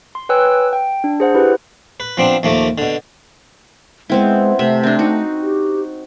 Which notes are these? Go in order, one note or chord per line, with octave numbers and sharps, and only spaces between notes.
C6
B4 C#5 G5 G#5 E6 F#6
G5
D4
G#4 C5 F#5
E4 G4 B4
B4
F3 B3 C4 D4
D#2 F3 A3 A#3
B2 D3
G#3 B3 C4 E4
C3 A3 E5
C4 D4
D#4 F#4
G4